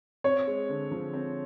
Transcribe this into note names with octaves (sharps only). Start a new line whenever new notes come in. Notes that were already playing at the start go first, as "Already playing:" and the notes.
C4 C#5
G#3
D3
F3
C4